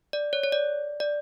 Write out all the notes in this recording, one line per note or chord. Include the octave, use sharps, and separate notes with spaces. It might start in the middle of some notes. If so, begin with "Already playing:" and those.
D5
C#5
C#5
D5
D5